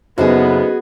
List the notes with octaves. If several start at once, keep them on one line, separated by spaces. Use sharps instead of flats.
F#1 B3 D#4 F#4 G#4 A4 C5